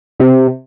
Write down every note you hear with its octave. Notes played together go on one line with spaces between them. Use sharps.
C3